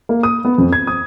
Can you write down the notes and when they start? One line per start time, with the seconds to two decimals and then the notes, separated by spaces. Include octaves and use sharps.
0.09 A#3
0.23 D#6
0.45 B3
0.58 F2
0.73 G#6
0.87 D#6